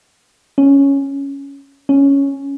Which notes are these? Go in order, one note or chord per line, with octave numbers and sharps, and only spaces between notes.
C#4
C#4